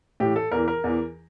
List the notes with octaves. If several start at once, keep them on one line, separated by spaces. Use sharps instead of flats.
A2 E3 G4
A4
E2 E3 A#4
A#4
E2 E3